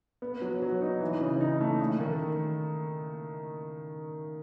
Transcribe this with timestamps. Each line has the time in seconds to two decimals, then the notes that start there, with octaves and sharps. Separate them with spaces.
0.22 B3
0.42 F#3
0.62 F#3
0.82 D#4
1.01 E3
1.21 C#3
1.40 D#4
1.61 A3
1.80 A3
2.00 D#3